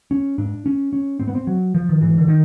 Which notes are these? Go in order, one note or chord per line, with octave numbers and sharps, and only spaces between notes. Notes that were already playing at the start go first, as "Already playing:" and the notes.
C#4
G#2 D4
C#4
C#4
G#2 C4
B3
C4
F#3
F3
D#3
G#2 E3
D3
D#3